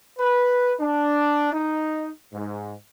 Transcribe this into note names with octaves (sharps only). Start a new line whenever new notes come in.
B4
D4
D#4
G#2